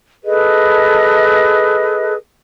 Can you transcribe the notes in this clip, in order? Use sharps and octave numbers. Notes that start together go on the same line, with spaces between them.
G#4 A4 B4 D#5